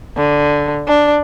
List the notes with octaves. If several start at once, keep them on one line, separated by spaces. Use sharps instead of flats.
D3
D4